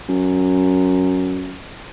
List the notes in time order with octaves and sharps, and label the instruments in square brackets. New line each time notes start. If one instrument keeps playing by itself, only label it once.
[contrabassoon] F#2